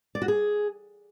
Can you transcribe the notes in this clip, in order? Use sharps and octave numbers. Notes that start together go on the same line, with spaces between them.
D5
F#4
G#4